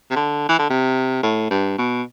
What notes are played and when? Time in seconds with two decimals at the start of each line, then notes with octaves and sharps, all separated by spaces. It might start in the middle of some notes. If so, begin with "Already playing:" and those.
0.11 C3
0.16 D3
0.48 E3
0.59 D3
0.70 C3
1.23 A2
1.51 G2
1.78 B2